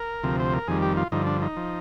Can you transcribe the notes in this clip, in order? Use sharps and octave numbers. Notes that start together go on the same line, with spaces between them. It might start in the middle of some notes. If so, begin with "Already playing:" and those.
Already playing: A#4
D2 C3 F3
C5
A#4
F2 D#3 G3 G#4
G4
F4
G2 D3 F3 D#4
D4
D#4
F3